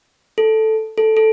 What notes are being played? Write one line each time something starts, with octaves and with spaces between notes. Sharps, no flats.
A4
A4
A4